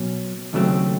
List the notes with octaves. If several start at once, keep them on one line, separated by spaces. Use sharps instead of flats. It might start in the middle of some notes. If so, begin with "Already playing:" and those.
Already playing: B1 B2 F#3 C#4
D#2 C#3 F#3 A3 C4